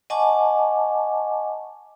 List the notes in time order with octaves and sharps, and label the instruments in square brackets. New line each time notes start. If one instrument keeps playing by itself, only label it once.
[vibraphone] D#5 F#5 G#5 A5 C#6 D6